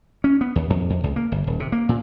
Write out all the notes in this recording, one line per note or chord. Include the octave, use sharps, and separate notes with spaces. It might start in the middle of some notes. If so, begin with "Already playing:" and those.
C#4
B3
D#2
F2
F2
C#2
A#3
G1
D#1
C3
A#3
A#2